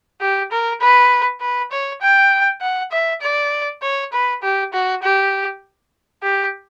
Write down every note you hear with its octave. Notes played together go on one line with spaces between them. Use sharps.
G4
A#4
B4
B4
C#5
G5
F#5
E5
D5
C#5
B4
G4
F#4
G4
G4